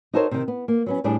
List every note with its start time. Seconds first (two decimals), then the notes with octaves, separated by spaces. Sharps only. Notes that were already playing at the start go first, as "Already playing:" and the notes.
0.14 D#4 F#4 A4 A#4 C5 C#5
0.31 C3 D#3
0.48 B3
0.68 A#3
0.86 F#3 B3 C#4
1.04 A2 G3 D4 G#4 A5